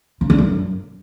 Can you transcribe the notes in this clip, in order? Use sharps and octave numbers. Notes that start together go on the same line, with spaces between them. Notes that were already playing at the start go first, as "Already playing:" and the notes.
C#3
D3
F#2